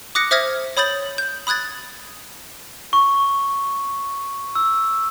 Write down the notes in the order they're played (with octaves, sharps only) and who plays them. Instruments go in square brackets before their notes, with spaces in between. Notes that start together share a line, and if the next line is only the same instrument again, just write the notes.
[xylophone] D6 D#6 F#6 A#6 C#7
C5 E5 D#6 F6 G#6 A#6
C#5 B5 D#6 G6 A6 F#7
G6
B5 D#6 F#6 G#6 A6
[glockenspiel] C#6
E6